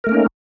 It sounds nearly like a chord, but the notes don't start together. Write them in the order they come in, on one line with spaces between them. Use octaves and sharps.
A#4 A3 A#3 C#4 D#4